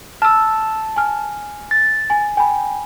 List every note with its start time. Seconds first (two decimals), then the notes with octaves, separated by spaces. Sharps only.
0.22 A5 E6 F6
0.96 G#5 F6
1.71 A6
2.10 G#5
2.37 G5 G#5 B5